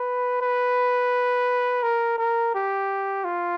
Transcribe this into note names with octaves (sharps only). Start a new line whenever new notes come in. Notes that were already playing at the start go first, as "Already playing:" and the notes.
Already playing: B4
B4
A#4
A#4
G4
F4